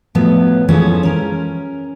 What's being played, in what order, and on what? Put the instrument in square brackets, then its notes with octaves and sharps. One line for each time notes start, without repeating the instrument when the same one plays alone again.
[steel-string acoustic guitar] A2 F3 F#3 B3
E3 F3 G#3 C#4 F4 A4
C#4 A#4